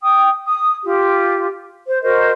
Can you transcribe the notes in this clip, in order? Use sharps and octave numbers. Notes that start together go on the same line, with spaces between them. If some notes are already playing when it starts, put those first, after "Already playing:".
G5 D#6
D#6
F4 G4
C5
F#4 A#4 C5 D#5